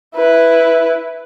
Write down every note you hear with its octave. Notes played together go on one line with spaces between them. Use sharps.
E4 B4